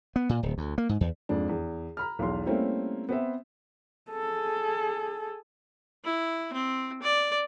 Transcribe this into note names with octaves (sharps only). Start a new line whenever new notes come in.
B3
A#2
D1
D2
A#3
G#2
E2
F2 G#2 D4
E2
A#5 B5 F6
B1 E2 C6
G3 A3 A#3 C4 C#4 E4
B3 C4 E5
G#4 A4
E4
C4
D5